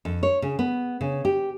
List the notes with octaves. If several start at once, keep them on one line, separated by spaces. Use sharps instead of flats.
F2
C#5
C#3
B3
C#3
G4